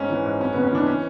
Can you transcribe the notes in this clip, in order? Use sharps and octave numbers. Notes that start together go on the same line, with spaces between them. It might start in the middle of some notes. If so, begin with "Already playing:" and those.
Already playing: G#2 C#4
E3
G#2
F#2 C#4
C#3 B3
C#4
E3 D4
C#4